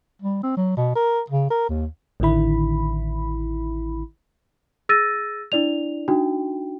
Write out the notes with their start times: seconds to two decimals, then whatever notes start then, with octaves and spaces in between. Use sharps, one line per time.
0.22 G3
0.43 C4
0.57 F#3
0.77 B2
0.95 A#4
1.30 C#3
1.50 A#4
1.69 D#2
2.20 A1 D3 D#3 E4 B5
4.89 G#4 E6 A6 A#6 D#7
5.52 D4 E4 D5 F7
6.08 D4 D#4 F#4 G5